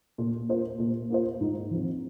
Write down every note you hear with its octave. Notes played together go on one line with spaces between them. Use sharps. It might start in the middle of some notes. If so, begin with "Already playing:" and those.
A#2
A#3 F4 C5
A#2
A#3 F4 C5
G#2
F3 C4